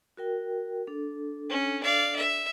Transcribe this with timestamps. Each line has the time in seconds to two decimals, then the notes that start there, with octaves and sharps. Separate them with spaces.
0.17 F#4 A#4 G5
0.87 D4 A4
1.49 C#4
1.83 D5 F5
2.16 E5